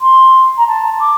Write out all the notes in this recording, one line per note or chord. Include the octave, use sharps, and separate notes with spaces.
C6
A#5
A5
D6